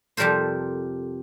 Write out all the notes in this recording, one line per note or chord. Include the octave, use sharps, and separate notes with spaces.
F2 C3 G3 A4 A#4 C5